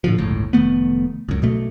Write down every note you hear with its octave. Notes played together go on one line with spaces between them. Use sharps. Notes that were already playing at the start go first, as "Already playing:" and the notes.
A2 D3 F3
G1 C#2 A2
F1 D#3 A3 B3
C#2 F#2
B1 B2 A3